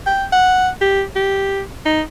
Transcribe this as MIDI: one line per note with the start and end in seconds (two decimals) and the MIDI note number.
0.07 0.25 79
0.33 0.69 78
0.82 1.04 67
1.16 1.62 67
1.86 2.02 63